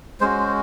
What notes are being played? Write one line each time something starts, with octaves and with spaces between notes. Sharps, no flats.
G#3 C#4 F#4 C5